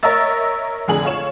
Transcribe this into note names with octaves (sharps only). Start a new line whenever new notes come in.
A#4 C#5 D#5 E5 E6 A6
F1 F2 D3 G#4 F#7
F4 C#5 E7